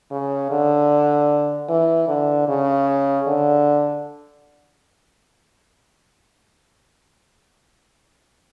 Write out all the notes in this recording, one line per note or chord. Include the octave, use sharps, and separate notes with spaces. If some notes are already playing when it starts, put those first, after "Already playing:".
C#3
D3
E3
D3
C#3
D3